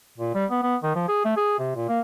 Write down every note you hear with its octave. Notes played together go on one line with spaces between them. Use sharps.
A#2
G3
B3
B3
D#3
F3
G#4
A3
G#4
C3
A#2
A#3